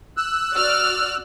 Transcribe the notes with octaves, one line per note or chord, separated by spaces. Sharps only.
E6 F#6
F#4 D5 F6